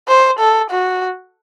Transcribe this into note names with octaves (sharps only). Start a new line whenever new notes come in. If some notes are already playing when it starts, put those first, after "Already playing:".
C5
A4
F#4